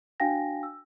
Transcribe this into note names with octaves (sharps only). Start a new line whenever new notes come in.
D4 F#4 F5 G5 G#5 A#6
E6